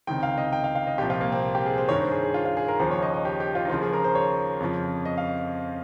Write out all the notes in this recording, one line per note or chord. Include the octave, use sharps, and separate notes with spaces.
C#2 C3 D#3 G5
F5
D#5
G5
F5
F5
D#5
C2 A#2 F3 G4
F4
A#3
C4
G4
G#4
C5
G2 D#3 C#5
C5
G#4
G#4
F4
F4
G#4
A#4
D#2 C#3 F3 C5
C#5
D#5
D#5
G4
G4
F4
D#4
D#2 C#3 F3 F4
G#4
A#4
C5
C#5
F2 C#3 F3
D#5
F5